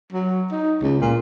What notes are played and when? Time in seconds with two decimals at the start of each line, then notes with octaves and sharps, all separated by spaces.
0.12 F#3
0.51 D#4
0.82 C#2
1.01 A#2